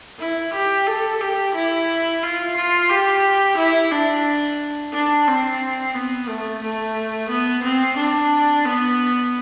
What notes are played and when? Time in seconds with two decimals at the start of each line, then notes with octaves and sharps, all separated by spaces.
0.19 E4
0.54 G4
0.87 A4
1.21 G4
1.55 E4
2.23 F4
2.56 F4
2.90 G4
3.57 E4
3.92 D4
4.93 D4
5.28 C4
5.94 B3
6.28 A3
6.62 A3
7.30 B3
7.63 C4
7.97 D4
8.66 B3